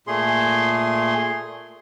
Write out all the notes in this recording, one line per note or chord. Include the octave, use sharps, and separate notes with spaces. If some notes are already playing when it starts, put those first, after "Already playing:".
A#2 A3 G#4 C6